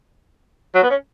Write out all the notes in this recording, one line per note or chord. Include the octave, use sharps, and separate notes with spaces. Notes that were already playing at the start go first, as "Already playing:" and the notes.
F#3
B3
C#4